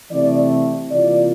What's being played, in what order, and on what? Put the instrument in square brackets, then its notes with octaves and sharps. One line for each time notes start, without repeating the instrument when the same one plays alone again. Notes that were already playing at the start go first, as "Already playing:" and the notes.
[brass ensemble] C3 E3 A3 C4 D5
C3 E3 A#3 F4 D5